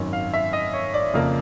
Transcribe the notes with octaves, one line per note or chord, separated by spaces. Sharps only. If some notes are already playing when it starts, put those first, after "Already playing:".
Already playing: G#1 F#2 D#3
F5
E5
D#5
C#5
D5
F2 C#3 F3 A#3